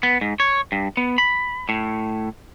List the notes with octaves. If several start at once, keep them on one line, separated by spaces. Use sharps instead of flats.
B3
G#2
C#5
G2
B3
B5
A2